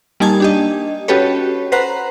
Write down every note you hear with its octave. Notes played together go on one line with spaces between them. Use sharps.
G3 A#3 D#4 G#5 A5 G#6
D4 G4 D#5
C#4 F#4 G4 A4 B4 C#5
B4 C5 F#5 A#5 F#6